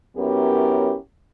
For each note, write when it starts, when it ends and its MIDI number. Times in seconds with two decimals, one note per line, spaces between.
0.17 0.95 42
0.17 0.95 59
0.17 0.95 61
0.17 0.95 64
0.17 0.95 67
0.17 0.95 70